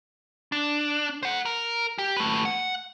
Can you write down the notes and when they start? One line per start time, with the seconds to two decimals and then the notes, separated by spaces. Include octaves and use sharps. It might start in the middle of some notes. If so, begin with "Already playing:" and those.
0.52 D4
1.23 C5 F#5
1.45 A#4
1.98 G4
2.17 A3 B4
2.45 F#5